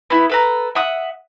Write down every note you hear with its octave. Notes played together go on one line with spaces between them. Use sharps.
B3 E4
A4 B4 A#5
E5 F#5 D#6